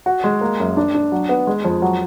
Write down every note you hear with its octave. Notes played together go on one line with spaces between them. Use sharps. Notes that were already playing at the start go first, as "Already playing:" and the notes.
F#4
G#3
A#3
F#2
D4
D4
F#3
B3
G#3
F2
F#3